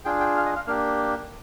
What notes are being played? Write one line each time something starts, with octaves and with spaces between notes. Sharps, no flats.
D4 F4 G#4 G5
G5
F5
D#5
F5
A#3 D4 G4 F5